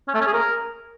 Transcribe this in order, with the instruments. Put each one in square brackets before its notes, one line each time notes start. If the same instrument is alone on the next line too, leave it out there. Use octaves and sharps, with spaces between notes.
[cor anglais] C#4
A3
C#4
G#4
A#4